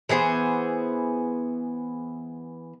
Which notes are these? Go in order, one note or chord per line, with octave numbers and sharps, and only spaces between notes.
E3 B3 G#4 C5